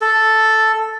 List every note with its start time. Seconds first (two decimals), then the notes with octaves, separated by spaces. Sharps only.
0.01 A4